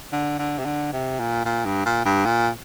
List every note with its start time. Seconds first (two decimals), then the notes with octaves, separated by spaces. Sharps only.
0.12 D3
0.39 D3
0.59 C3
0.65 D3
0.93 C3
1.20 A#2
1.45 A#2
1.65 G2
1.86 A#2
2.05 G2
2.25 A#2